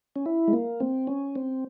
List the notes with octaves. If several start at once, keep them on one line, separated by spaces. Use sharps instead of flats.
C#4
E4
G#3
A#3
C4
C#4
C4